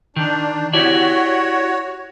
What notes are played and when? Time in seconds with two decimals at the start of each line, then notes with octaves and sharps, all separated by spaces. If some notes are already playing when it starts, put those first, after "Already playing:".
0.16 D#3 D4
0.73 E4 F#4 G4 C#5 D5